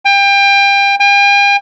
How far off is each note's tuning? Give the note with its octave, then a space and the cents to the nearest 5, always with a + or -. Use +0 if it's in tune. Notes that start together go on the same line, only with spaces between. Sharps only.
G5 +30
G5 +45